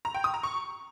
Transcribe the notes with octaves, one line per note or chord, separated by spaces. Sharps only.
A#5
G5
D#6
A#5
C#6